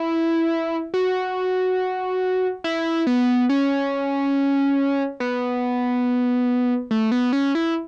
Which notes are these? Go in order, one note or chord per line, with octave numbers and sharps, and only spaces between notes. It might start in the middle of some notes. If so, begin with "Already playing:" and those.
Already playing: E4
F#4
E4
B3
C#4
B3
A3
B3
C#4
E4